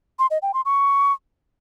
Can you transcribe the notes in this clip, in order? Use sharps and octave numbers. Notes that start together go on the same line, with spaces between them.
C6
D#5
G5
C6
C#6